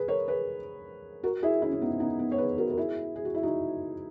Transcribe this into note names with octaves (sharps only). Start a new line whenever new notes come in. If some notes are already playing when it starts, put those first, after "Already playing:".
Already playing: G#4 B4
A#4 C#5
G#4 B4
F#4 A#4
E4 G#4
C#4 E4
C#4
B3 D#4
B3 D#4
B3 D#4
C#5
G#4 B4
F#4 A#4
A#4
E4 G#4
G#4
F#4
E4
D#4 F#4